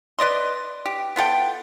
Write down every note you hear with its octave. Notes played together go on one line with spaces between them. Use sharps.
B4 D5 D#5 C6
G4
B3 F4 A4 G5